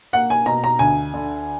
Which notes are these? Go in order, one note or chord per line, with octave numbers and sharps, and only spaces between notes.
A#3 F#5
G#5
B2 A#5
A#5
D2 G#5
D3